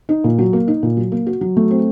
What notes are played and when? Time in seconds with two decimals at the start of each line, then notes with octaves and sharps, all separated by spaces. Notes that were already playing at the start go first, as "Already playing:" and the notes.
0.09 D#4
0.24 A#2
0.39 F#3
0.53 A#3
0.68 D#4
0.83 A#2
0.97 F#3
1.12 A#3
1.27 F#4
1.41 F#3
1.57 A3
1.71 C4